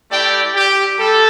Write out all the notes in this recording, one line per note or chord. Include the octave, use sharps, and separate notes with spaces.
A3 E4 G4 D5 G5
G4
G3 A4